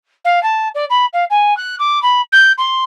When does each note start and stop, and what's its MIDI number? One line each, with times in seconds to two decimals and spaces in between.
0.25 0.42 77
0.43 0.68 81
0.75 0.85 74
0.90 1.05 83
1.13 1.24 77
1.30 1.56 80
1.57 1.76 90
1.79 2.02 86
2.02 2.21 83
2.32 2.52 91
2.58 2.84 84